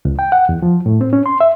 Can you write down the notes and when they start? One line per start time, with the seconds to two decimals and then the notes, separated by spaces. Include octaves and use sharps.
0.05 C#2
0.19 G5
0.32 F#5
0.49 E2
0.62 F3
0.86 A2
1.01 C4
1.13 C#4
1.26 C6
1.40 E5